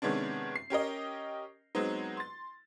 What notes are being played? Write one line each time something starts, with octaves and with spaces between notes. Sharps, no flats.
C3 D#3 G#3 B3 C#4 D4
C7
C#4 G4 A#4 D#5
F#3 G#3 B3 C4 D#4
C6 A6